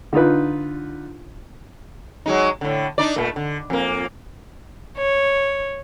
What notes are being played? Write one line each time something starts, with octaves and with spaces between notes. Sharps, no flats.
D3 D#4 F4 B4
F#3 G#3 D#4
A2 D3
D4 D#4 D5
A#2 A3
D3
F2 A#3
C#5